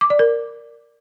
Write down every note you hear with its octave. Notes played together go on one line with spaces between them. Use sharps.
D6
D5
A#4